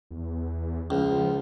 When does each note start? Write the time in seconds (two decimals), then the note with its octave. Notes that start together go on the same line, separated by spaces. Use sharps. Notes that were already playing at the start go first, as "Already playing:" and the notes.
0.11 E2
0.90 C#2 F3